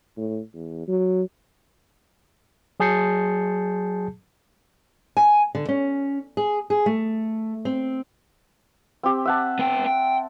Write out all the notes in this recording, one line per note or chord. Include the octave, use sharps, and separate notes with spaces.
A2
E2
F#3
F#3 G#4 A5 G6 C7 C#7
G#5
D3
C#4
G#4
G#4
A3
C4
C4 G4
E5 F#5 A5
B3 G5
G5